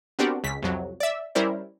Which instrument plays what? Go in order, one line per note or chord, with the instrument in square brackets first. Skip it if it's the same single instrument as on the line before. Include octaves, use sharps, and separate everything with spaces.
[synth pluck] B3 C4 D4 F#4 G4 A#4
C#2 C#3 B6
C2 F2 F#3
D5 E5
G3 C#4 E4 A#4 C5 D5